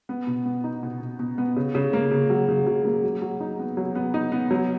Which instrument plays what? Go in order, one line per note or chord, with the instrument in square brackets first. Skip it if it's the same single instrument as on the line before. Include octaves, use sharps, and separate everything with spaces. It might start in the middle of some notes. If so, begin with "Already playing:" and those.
[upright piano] B3
B2
B3
D#4
B2
B2
B2
B3
C#3
C#3
A#3
C#3
F#3
C#3
F#3
A#3
F#3
F#3
D#4
B3
F#3
B3
D#4
B3
F#3